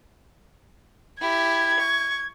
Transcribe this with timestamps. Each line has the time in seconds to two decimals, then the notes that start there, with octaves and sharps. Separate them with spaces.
1.21 E4 G4 G#6
1.79 C#6